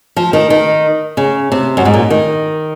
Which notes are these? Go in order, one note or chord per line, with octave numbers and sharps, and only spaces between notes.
F3
D#3
D#3
C#3
C3
F#2
G#2
A#2
D#3